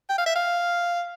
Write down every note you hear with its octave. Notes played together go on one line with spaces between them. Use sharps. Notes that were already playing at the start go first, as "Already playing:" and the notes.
G5
F5
E5
F5